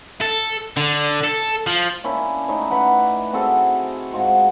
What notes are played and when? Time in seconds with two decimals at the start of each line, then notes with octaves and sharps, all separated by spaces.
0.21 A4
0.77 D3
1.24 A4
1.67 F3
2.04 A#3 C#4 D4 E4
2.48 A3 C#4 D#4 E4
2.71 B4 D5 F#5
3.33 C4 F#4 G#4 A4
4.13 G#2 F4 F#4 F#5